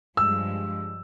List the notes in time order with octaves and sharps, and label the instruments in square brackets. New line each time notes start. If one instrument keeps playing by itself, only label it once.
[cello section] G2 F3 G#3 [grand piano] E6